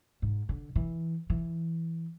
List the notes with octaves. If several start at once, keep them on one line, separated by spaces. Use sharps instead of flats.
G#2
D3
E3
E3